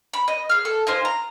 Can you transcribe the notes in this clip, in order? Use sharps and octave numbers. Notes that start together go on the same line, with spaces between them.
B5
D#5
G#4 F6
A4
D#4 F4 C5 G#5
A#5